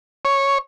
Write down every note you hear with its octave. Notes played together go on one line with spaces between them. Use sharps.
C#5